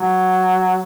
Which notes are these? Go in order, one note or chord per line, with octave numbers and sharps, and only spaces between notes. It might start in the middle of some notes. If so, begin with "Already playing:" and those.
Already playing: F#3